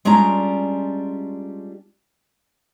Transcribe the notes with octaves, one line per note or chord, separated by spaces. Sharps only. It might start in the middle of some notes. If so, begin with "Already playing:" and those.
G3 G#3 C#4 D4 F4 A#5